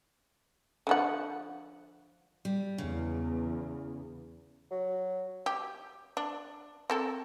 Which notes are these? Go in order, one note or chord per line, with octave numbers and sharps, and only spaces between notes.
D3 F3 F#5
G3
E2 C#3
F#3
G4
D4
C4 A4 A#4